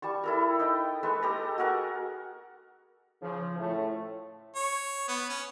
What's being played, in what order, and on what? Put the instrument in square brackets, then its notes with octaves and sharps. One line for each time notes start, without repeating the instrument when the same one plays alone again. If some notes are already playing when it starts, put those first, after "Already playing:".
[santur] G3 A5 C#6
E4 A4 A#4
D#4 D#5 G5
G#3 A4 B4 C#6
G4 A4 D#5 A#5
F#4 G#4 A#4 F#5
[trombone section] C#3 F3
A2 A3
[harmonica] C#5
B3
C#4